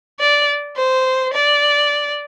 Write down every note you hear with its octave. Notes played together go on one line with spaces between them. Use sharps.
D5
C5
D5